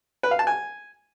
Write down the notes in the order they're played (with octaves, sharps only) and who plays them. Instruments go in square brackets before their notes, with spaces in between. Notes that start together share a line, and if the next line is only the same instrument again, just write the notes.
[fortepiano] B4
F5
A5
G#5